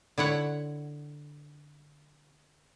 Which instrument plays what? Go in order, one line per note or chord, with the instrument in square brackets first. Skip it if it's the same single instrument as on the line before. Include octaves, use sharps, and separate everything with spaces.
[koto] D3 E4 C#5 F#5